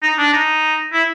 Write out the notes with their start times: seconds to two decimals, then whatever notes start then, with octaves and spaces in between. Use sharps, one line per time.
0.03 D#4
0.18 D4
0.33 D#4
0.93 E4